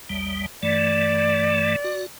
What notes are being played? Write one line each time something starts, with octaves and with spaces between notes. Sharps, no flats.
A1 D#2 G3
G2 E3 A3 D5
F#4